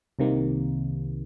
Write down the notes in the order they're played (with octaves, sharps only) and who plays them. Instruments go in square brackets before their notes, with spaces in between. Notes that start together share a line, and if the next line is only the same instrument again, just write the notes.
[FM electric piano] C2 C3 D#3 A#3